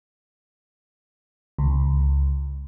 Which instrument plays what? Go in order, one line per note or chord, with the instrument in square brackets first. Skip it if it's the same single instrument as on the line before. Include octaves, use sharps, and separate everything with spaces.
[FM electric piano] C#2